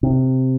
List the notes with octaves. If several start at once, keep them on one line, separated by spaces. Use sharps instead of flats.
C3